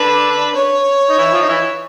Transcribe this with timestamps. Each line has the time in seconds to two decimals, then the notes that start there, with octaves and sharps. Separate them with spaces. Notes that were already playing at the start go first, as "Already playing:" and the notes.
Already playing: D3 D4 B4
0.55 C#5
1.09 D#4
1.17 E3 E4
1.32 F3 F4
1.41 D#4
1.48 E3 E4